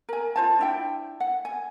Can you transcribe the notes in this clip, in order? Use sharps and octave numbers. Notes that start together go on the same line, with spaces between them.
A#4 G#5
F4 C5 A5
D4 E4 G5
F#5
G#5